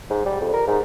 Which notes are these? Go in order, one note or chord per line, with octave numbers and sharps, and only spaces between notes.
G#2
G3
F2
A#4
G#2